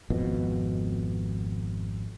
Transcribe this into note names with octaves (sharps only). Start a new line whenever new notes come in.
G#1 F2 B2